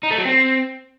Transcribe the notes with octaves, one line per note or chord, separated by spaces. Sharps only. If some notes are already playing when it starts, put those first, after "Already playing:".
D#4
A3
F#3
C4